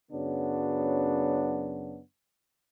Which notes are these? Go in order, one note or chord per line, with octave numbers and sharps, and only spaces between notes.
F#2 C#3 F#3 B3 D4